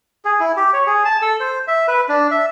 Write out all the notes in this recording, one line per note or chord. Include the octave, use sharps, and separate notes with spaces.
G#4
E4
G4
C#5
G#4
A5
A4
C5
E5
B4
D4
E5